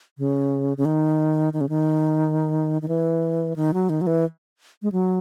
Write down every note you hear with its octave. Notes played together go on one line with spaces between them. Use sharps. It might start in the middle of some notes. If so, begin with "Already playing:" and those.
C#3
C#3
D#3
D#3
C#3
D#3
D#3
E3
D#3
F#3
D#3
F#3
E3
G#3
F#3